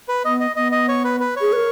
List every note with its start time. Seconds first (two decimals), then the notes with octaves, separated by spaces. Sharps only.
0.08 B4
0.24 B3 D#5
0.40 D#5
0.56 B3 D#5
0.72 D#5
0.88 C#5
1.04 B4
1.20 B4
1.36 G#4 C#5
1.53 B4
1.56 A#4